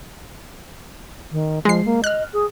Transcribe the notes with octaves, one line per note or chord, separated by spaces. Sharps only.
D#3
F3 G#3 C7
A#3
D#5 F6 F#6
G#4